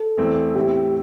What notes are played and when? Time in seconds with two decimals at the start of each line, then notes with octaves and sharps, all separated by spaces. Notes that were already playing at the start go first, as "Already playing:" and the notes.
Already playing: A4
0.17 E2 E3 A3 C4
0.55 A2 E3 C4 E4 G4